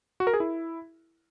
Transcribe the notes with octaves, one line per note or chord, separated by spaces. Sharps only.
F#4
A#4
G#4
E4